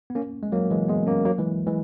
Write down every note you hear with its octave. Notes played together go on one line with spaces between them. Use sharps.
B3
A#3 C#4
G#3
F#3 A#3
E3 G#3
G#3 B3
A#3 C#4
F#3 A#3
E3 G#3
E3 G#3